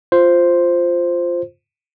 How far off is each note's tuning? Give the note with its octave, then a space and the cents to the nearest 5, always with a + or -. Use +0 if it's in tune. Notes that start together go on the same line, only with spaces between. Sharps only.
F4 +0 C5 +0